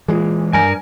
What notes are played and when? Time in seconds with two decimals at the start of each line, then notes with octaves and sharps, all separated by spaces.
0.08 A#2 E3 G#3 G#4
0.53 G2 A#4 G#5